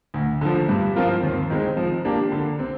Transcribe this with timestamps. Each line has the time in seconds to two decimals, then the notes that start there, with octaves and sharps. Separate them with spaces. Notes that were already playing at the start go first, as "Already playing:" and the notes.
0.14 D2
0.41 D3 F3
0.69 G2
0.96 F3 C4 F4 A#4
1.23 D#2
1.50 D#3 G#3 C4
1.77 F3
2.05 A#3 D4 G4
2.32 D3
2.59 C4